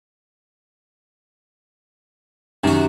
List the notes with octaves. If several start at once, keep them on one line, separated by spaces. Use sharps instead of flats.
F#2 C3 D#3 F#4